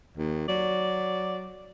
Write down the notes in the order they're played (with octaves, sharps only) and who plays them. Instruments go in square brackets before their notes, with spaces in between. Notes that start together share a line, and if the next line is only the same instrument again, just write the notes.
[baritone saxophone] D#2
[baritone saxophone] F#3 [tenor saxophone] D5